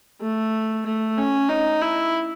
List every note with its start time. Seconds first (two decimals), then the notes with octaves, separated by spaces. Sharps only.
0.21 A3
0.86 A3
1.18 C#4
1.49 D#4
1.82 E4